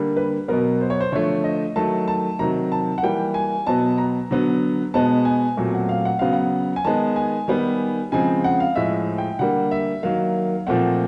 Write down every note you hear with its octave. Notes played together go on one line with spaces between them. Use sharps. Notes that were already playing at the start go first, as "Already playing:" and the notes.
Already playing: D3 G3 A#3
B4
B2 F#3 B3 A#4
C5
C#5
C5
D3 F3 A3 C#5
D#5
D#3 F#3 A3 A5
A5
C3 D#3 F#3 A#5
A5
F#5
E3 G3 A#3 G5
G#5
B2 F#3 B3 A5
A#5
D3 F#3 B3
B2 G#3 B3 A5
G#5
A#2 F#3 A3 C4
F#5
F5
F#5
C#3 F#3 B3 F5
F#5
G#5
D#3 G#3 B3 A5
G#5
D#3 G3 B3
C#3 F3 G#3 C4 G#5
F#5
F5
A2 F3 G#3 E5
G5
D3 G3 A#3 F#5
E5
D#3 F#3 A#3 F5
A#2 F3 A3 C4 F#5